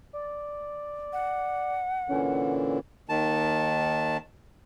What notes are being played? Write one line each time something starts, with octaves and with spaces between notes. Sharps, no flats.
D5
F#5
A#2 D3 E3 C#4
D#2 D#3 A5